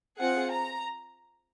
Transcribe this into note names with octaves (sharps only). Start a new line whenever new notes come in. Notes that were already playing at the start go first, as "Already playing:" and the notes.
C4 F4 G#4 F#5
A#5